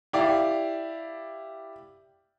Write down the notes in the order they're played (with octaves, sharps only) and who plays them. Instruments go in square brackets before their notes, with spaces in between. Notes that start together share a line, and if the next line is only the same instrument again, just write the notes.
[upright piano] E4 G4 D5 F5